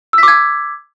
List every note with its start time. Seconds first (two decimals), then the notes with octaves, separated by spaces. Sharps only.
0.13 E6
0.18 B6
0.23 D6
0.28 G#6